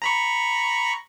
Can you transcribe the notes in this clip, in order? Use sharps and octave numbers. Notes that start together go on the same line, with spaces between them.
A#5 B5 C#6